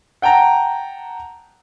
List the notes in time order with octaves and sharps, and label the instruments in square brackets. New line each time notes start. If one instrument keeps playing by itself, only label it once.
[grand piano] F#5 G5 A5 A#5